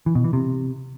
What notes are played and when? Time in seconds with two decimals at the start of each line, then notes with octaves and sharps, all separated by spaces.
0.06 E3
0.15 B2
0.24 E3
0.33 C3